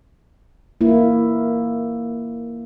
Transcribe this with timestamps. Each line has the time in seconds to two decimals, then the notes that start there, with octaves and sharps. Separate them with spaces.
0.81 A#3 E4